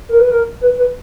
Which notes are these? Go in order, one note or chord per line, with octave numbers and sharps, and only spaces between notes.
A#4
B4
A#4
B4
B4